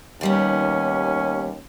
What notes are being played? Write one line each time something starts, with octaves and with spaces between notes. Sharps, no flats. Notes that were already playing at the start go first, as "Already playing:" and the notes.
D#2 D#3 G3 B3 C#4